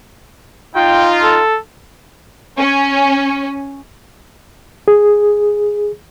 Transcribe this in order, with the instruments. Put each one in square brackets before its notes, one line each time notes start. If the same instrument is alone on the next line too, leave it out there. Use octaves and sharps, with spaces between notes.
[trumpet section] D#4 F4 [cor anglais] G5
[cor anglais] A4
[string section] C#4
[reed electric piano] G#4